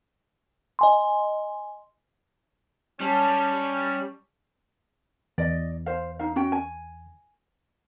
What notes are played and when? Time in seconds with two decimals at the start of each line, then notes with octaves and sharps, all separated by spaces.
0.79 D#5 G#5 C6
3.00 G3 C#4 A5
5.38 E2 D5 D#5
5.86 C5 F5
6.19 D#4 F5
6.36 C#4 F#4 G5
6.52 G#5